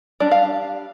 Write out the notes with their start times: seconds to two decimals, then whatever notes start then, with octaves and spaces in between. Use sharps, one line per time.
0.20 G3 D4 D5
0.31 F5